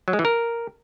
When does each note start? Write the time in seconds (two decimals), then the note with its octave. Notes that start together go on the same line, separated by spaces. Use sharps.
0.08 F#3
0.13 G#3
0.19 E3
0.25 A#4